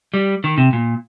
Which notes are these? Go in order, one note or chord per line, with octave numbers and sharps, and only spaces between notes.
G3
D#3
C3
A#2